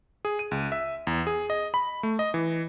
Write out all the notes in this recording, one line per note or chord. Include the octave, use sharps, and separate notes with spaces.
G#4
D#7
C#2
E5
E2
G#4
D#5
B5
A3
D#5
E3